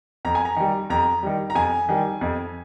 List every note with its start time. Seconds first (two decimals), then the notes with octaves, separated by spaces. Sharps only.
0.25 F2 A#5
0.35 G#5
0.45 A#5
0.56 D#3 G3
0.90 F2 A#5
1.23 D#3 G3
1.50 A#5
1.55 F2 G#5
1.89 D#3 G3
2.21 F2